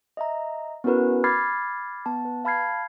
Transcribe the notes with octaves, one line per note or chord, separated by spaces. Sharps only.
D#5 E5 A#5
B3 C#4 E4 F#4 A#4 B4
B5 D6 F6 G#6 A6 C7
B3 A5
B4
F5 A5 B5 F6 G#6 C7